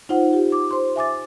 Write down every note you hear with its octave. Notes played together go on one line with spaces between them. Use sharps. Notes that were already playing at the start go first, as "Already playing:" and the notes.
D#4 F4 C5 F#5
F4 G4
D6
C5 C6
E5 G#5 D6 A6